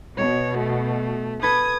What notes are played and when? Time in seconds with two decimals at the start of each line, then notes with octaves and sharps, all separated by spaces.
0.17 B2 C#5
0.58 A3
1.43 A4 B4 D#6 G#6